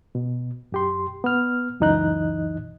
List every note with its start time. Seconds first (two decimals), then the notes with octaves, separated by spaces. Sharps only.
0.15 B2
0.72 F#2 G4 C6
1.24 B3 F6
1.80 C#2 F#2 E3 D#4 D#5 F#6